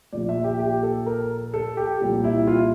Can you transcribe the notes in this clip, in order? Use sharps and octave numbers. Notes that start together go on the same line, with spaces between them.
A#1 A#2 F3 D5
E5
G4
G4
A4
A#4
A4
G4
C2 A#2 F3
E4
F4